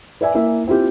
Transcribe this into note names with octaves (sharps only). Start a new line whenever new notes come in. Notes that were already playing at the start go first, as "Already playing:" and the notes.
B4 D5 E5 G#5
A#3 E4 E5
C4 E4 F4 G4